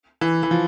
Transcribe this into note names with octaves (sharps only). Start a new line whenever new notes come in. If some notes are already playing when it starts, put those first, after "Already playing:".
E3
E3
F3